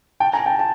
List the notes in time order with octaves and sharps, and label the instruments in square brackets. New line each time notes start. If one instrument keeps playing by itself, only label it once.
[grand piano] G5 A5
G#5 A#5
G5 A5
A5